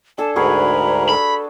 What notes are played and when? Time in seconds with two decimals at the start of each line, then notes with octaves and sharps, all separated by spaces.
0.18 D4 A4 G#5 A5
0.36 D2 G#2 F#4 G#4 A#4 B4 B5
1.09 A4 B5